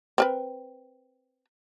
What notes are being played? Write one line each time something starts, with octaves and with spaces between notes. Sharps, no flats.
C4 A#4 B4